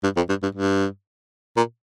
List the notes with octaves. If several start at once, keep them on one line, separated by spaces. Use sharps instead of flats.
G2
F2
G2
G2
G2
A#2